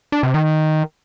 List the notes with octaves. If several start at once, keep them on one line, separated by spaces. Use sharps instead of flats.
D4
C3
D#3